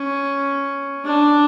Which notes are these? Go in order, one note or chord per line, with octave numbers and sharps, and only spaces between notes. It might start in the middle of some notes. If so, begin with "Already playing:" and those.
Already playing: C#4
D4